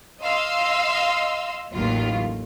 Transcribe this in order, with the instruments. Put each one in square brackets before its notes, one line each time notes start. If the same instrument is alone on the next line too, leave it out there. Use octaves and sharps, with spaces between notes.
[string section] D#5 F5 C6 E6
A1 D#2 D#3 F#3 F4